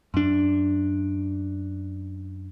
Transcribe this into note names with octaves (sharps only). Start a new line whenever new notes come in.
F#2 D4